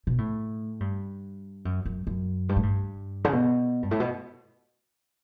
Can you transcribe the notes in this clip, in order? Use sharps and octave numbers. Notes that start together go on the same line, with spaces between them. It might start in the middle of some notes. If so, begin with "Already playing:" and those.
B2
A2
G2
F#2
F#2
F#2
G2
A2
G2
C#3
B2
G2
A2
B2